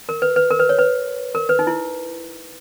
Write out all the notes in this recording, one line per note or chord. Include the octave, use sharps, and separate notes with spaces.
A#4
B4
B4
A#4
B4
C#5
B4
A#4
B4
D#4
E4